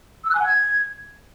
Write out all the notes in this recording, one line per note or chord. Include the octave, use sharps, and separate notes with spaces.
E6
F#6
G#5
F#5
G#6